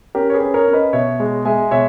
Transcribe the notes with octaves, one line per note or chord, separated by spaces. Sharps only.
C#4 G4 A#4
C#5
G#4 B4
C#4
A#4 C#5
C#4
B4 D#5
B2 C#5 E5
G#3
G#3 E5 G#5
B2 C#5 E5